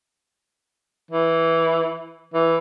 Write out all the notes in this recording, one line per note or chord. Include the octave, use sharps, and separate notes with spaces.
E3
E3